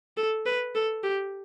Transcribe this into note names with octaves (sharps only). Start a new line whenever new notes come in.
A4
B4
A4
G4